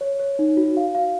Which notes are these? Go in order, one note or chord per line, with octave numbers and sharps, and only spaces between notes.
C#5
C#5
D#4
F#4
F5
F5